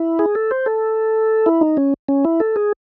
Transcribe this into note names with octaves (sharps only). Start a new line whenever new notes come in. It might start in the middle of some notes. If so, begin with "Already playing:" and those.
Already playing: E4
G#4
A4
C5
A4
E4
D#4
C#4
C#4
E4
A4
G#4